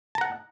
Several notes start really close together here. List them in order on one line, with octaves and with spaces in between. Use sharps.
A5 A#5 F#5